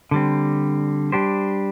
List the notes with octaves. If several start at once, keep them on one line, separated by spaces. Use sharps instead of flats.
D3 G3 C4
G3 D4 G4 C5